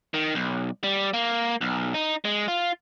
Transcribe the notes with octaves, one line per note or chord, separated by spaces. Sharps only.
D#3
B1
G3
A#3
B1
D#4
G#3
F4